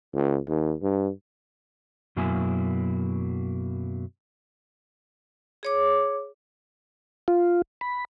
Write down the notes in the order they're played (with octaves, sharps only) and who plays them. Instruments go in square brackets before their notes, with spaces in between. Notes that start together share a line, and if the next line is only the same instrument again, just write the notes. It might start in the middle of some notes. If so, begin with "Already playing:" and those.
[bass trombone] C#2
D#2
G2
[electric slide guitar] F#2 B2 F#3 A#3 E4 G#5
[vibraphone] G#4 C#5 D6
[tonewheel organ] F4
B5